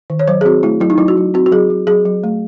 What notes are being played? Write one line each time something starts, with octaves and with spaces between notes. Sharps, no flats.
D#3
C#5
F#3 C5
G#4
C4 F#4
A3 E4
F#3 E4
D#4
F#3 E4
F#4
F#3
C4 F#4
F#4
F#3 G#4
F#3
F#3 G#4
F#3
A3